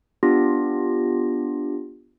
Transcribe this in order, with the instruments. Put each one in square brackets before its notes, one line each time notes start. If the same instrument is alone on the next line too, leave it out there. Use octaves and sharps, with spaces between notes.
[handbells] B3 D4 F4 G4 A#6